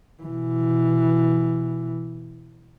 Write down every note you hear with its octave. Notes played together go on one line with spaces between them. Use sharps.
B2 E3